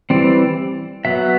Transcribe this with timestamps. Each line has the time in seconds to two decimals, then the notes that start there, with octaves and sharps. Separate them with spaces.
0.10 E3 G3 C4 D5
1.05 F#3 B3 E5